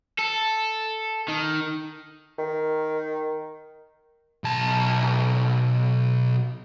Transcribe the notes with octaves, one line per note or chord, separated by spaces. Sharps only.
A4
D#3
D#3
B1 A5